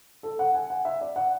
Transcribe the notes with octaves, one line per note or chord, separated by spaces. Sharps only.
A4
F#5
G#5
F#5
E5
D5
F#5